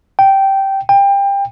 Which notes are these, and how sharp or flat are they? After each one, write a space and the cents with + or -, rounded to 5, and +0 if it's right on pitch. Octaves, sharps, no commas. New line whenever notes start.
G5 -10
G5 +25